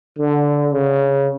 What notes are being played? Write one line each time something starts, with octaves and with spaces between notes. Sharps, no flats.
D3
C#3